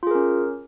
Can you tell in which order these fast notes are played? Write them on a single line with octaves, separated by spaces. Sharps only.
F4 G#4 A#4 C#4